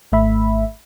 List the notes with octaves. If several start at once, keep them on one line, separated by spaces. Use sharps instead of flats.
G#1 A3 E5 B5